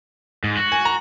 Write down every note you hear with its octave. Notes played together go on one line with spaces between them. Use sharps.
G#2
F#4
G#5
A#5